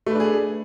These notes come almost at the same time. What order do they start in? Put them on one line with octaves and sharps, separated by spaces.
A3 B4 D4 G#4